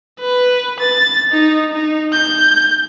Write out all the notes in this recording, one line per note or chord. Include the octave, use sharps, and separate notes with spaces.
B4
A6
D#4
D#4
G6